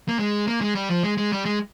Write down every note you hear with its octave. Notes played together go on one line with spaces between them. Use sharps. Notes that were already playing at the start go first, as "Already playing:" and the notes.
A#3
G#3
A#3
G#3
G3
F3
G#3
G#3
G3
G#3